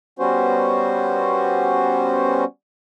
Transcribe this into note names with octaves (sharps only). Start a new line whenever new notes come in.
G3 B3 C#4 F#4 C5